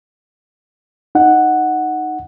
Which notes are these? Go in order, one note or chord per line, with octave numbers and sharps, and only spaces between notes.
D#4 F#5